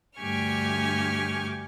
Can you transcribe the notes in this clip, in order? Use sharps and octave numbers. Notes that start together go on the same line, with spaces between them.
D2 G2 G4 G#5 C#6 F6